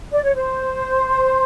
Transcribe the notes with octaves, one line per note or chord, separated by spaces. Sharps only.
D5
C#5
C5